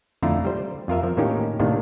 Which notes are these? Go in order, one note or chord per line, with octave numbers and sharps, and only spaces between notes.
F2 D3 A3 E4 F4 A#5
G3 C5
F2 F4 A#4 E5
F3
A2 D#3 A#3 C#4 D#4 G4
A2 C3 D#3 A#3 D4